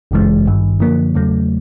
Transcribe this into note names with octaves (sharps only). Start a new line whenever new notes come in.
G1 F#2 C#3 E3 G#3
G#1 G2 D#3
F#2 D3 F3 A#3
E2 C#3 F#3 A3